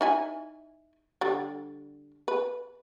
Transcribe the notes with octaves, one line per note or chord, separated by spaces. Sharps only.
D#4 E4 G#5
D3 G3
B4